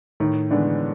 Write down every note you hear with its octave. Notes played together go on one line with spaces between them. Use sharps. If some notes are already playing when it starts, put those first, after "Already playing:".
A2 D#3
D3 E3 G#3 B3 D4